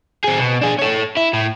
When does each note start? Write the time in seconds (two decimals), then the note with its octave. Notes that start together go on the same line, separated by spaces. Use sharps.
0.24 C4 G#4
0.39 B2
0.61 D4 G#4
0.79 A4 C#5
1.17 E4
1.33 A2